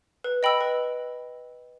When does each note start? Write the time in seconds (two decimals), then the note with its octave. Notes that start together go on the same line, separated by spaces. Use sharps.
0.24 B4
0.43 D#5 G5 B5 E6
0.61 B4